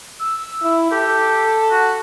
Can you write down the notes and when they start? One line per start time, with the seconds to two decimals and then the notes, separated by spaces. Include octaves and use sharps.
0.20 E6
0.62 E4
0.92 G4 A4
1.71 F#4